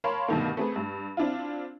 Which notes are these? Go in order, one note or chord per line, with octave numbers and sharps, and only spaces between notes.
A#4 C#5 F5 A5 B5 C6
G2 B2 D3 D#3 A3 A#3
A3 C4 G#4 B4
G2
C4 D4 E4 F4